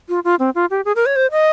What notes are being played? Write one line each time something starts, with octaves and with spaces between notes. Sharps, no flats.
F4
F4
C4
F4
G4
G#4
A#4
C#5
C5
D#5